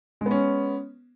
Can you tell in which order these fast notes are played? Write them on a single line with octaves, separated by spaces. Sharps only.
G#3 B3 C#4